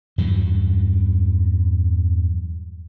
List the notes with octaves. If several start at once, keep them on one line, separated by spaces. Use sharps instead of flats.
E2 G2 E3 F#3